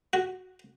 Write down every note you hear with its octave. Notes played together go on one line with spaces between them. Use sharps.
F#4